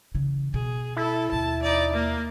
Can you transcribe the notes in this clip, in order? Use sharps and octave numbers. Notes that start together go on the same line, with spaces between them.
C#3 E3
B2 G#4
E4 A4
D#2 B2 A5
D#4 D5
A#3